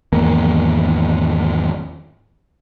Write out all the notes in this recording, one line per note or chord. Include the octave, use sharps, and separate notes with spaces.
G#1 E2 A#3